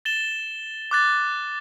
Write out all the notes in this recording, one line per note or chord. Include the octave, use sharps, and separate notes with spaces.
A6 E7 G7
D6 F#6 A6